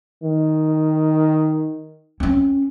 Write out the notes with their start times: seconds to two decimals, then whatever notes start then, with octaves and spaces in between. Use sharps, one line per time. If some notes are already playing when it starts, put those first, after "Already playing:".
0.23 D#3
2.20 C4 C#4